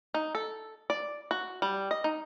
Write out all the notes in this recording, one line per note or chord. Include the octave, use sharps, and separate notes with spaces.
D#4
A4
D5
F#4
G3
D#5
D#4